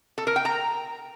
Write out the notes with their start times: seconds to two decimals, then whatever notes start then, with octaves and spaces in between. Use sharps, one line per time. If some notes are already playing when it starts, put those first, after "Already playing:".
0.18 A4
0.27 A#4
0.36 G5
0.45 A#5